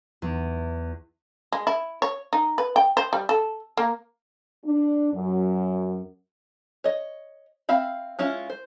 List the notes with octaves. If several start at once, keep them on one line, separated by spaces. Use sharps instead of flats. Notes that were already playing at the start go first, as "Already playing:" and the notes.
E2
G#3
E4
C#5
D#4
B4
G5
C5
G3
A4
A#3
D4
F#2
C#5 D#5
C4 E5 F5 B5
G#3 C#4 E4 F4
C5